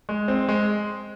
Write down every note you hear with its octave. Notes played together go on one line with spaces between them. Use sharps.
G#3
C4
G#3